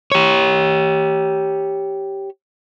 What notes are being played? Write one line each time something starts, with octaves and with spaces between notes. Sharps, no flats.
G4 C#5